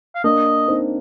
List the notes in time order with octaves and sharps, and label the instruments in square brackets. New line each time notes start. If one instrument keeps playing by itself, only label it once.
[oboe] F5
[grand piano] A#3 D4 [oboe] D#5
[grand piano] C4 D#4